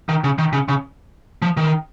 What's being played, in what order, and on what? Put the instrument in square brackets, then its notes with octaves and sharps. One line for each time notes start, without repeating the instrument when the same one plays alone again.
[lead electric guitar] D#3
C#3
D#3
C#3
C#3
F3
D#3